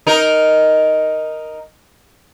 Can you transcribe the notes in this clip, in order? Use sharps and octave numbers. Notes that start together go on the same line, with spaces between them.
D#4 A#4